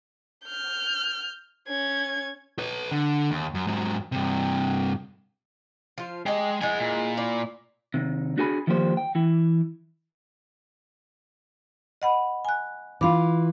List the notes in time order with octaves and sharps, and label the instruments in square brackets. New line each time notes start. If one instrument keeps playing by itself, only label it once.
[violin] F6 G6
C#4 G#6
[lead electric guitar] B4 C#5
D3
D#2
F#2
G#2 F#3
G2 C3
[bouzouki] F3 F4
[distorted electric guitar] G#3 [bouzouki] D#4 G4
[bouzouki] G#3 E4 [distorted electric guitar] F#5 G#5
[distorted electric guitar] A#2
[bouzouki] E4 D5
[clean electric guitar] C3 D#3
D4 F#4 G#4 G#5 B5
D#3 F3 G3 A#3 G4 C5
G5
E3 E4
[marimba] D#5 F#5 B5
G#5 F#6
[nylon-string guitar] E3 F4 [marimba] F5 B5 D6